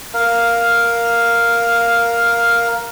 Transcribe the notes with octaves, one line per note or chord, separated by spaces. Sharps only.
A#4 F5